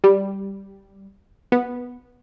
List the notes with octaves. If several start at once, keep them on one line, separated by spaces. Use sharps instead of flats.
G3
B3